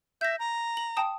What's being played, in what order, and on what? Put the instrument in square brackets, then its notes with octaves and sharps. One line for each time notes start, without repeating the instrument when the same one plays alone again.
[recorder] E5 [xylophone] G6 A#6
[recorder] A#5
[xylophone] F#7
G5 A5 D#6